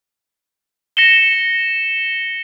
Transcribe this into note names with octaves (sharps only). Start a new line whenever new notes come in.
A#6 C#7 E7 G7